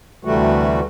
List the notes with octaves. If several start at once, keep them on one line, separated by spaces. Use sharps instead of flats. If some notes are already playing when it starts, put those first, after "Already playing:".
D2 C3 E3 G3 A3 F#4